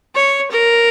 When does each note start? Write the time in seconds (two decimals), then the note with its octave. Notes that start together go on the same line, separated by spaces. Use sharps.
0.15 C#5
0.51 A#4